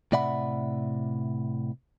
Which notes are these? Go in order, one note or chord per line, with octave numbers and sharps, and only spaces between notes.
A2 C3 D5 E5 F#5 B5